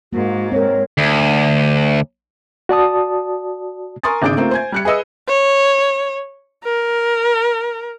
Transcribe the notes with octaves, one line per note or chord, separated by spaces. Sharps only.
G#2 A#3 F#4
C4 A#4 C#5
D2
F#4 D5 A5 D#6
A#4 G#5 C6 C#6 D#6 A6
G#1 C#3 D4 G#4 G6 D7
A3 A#3 C4 F4
C5 G#5 G#6
G3 F#6 C#7
G#4 B4 D#5 E6
C#5
A#4